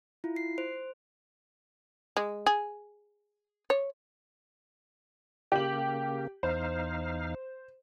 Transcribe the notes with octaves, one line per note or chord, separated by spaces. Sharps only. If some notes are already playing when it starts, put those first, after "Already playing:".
E4 F4
C7
C5
G#3
G#4
C#5
C#3 A#3 G4 F#7
E2 D#4 C5 F5